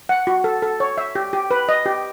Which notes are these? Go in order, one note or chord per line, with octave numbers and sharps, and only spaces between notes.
F#5
F#4
A4
A4
C#5
E5
G4
G4
B4
D#5
G4